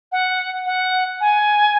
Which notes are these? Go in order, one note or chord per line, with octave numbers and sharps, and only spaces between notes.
F#5
F#5
G#5